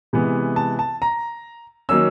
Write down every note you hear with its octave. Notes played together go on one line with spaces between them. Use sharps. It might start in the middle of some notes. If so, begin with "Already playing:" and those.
C3 E3 G#3 B3
A5
A5
A#5
D#3 F#3 A#3 C#4 E6